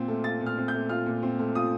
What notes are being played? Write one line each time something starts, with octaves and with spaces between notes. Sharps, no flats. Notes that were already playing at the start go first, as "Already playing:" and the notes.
Already playing: A#2 C4 F4
A3
F4 A6
A#2
F6
C4
G6
A3
F4 F6
A#2
C4
A3
F4 D#6